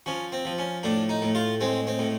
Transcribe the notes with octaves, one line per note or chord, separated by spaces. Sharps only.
F3 C#4
C4
F3
C#4
A2 D4
D#4
A2
F4
G#3 C4
C4
A2